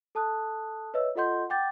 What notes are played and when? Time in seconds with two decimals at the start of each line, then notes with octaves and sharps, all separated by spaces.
0.15 A4 A5 D#6 F#6
0.94 B4 C#5 D#5 E5 E6
1.15 F4 A4 D#5 F#5 C6 G6
1.50 F#5 G5 D6 G6 A6